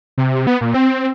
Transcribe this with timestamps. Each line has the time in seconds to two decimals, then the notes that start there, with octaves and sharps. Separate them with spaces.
0.18 C3
0.47 B3
0.61 A#2
0.74 C4